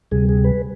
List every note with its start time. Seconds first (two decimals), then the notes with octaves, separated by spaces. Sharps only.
0.11 D2 C3 G3 G#4
0.29 G#4
0.44 B4